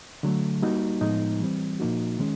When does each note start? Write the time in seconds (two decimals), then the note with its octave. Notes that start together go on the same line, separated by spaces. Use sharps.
0.23 D3 F#3 A3
0.62 G3 A#3 D#4 F#4
1.01 A2 F3 G#3 B3 D#4
1.40 E3 G3 C4
1.80 A#2 F3 A#3 D#4 F#4
2.19 D#3 G#3 C#4